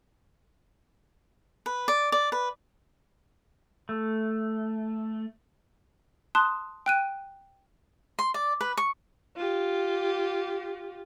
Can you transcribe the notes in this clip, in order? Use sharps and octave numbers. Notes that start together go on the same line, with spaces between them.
B4
D5
D5
B4
A3
A5 C6 D#6 F#6
G5 F#6 D#7
C6
D5
B4
C#6
F4 G4